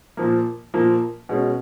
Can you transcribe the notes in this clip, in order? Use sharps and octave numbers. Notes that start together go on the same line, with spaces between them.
A#2 F3 A#3
A#2 F3 A#3
B2 G#3 C#4